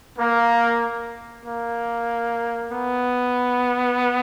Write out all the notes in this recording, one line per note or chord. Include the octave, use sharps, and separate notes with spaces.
A#3
A#3
B3